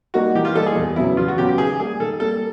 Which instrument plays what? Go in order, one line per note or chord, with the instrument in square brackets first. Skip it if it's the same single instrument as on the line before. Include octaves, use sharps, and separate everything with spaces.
[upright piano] G3 A#3 D#4 [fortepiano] F#4
[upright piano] E3 [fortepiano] G4
[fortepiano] F4
[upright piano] G3 A#3 D#4 [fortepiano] A4
[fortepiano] G#4
[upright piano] E2
[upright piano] C#3 F#3 B3 [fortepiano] E4
[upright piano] E2 [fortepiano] F4
[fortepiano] F#4
[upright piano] C#3 F#3 B3 [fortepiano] G4
[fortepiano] G4
[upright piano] D#3 [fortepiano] G#4
[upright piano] G3 A#3 [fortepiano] G#4
[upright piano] D#3 [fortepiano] A4
[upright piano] G3 A#3 [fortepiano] A4